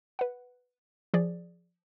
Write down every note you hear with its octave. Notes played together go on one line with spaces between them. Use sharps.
B4 F#5
F3 G#4 D5